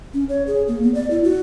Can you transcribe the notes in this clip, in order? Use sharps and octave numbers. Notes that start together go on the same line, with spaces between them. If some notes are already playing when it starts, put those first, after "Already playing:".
C#4
C#5
G#4
A#3
B3
D5
E4
F#4